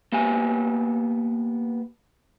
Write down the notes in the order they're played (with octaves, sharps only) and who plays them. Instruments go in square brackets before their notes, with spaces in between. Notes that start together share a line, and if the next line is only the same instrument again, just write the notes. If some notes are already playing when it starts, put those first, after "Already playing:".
[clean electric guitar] A#3 B3 G4 G#5